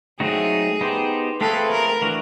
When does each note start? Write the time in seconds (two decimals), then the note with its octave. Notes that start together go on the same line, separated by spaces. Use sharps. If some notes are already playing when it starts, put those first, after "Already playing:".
0.20 F#3 A3 C4 D#4 F#4 G#4
0.81 B3 D#4 G4 C5
1.41 A3 C4 F4 G#4 A4 B4
1.71 A#4
2.01 E3 A3 D4 F#4 A#4